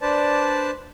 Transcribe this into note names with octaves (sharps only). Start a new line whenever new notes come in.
D4 B4 C5 D5 A5